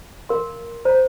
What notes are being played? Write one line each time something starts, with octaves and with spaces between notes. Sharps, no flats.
A#4 F5 C6
C5 A#5